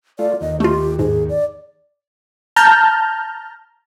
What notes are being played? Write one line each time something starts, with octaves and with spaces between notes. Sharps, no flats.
A3 F4 D5
D#2 D#5
A3 F4 G4
G#2 G#4
D5
A5 A#5 F6 G6